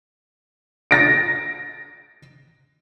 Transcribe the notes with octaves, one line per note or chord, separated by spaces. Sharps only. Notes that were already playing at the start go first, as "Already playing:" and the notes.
A6 A#6 D7